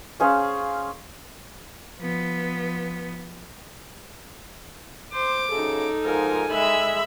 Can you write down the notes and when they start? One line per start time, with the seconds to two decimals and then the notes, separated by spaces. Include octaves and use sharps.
0.20 C#4 G#4 C5 F5
1.98 F3 B3
5.13 C5 D6
5.51 F#2 C#3 D#4 G#4 A4
6.05 G#2 F3 A#4 G#5
6.52 G#3 E5 B5